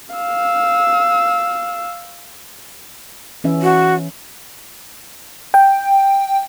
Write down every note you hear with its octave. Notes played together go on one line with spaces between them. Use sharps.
F5 E6
E3 C#4 E5
F#4
G5